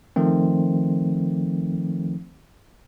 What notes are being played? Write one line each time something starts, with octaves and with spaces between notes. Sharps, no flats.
D#3 F3 A3 C4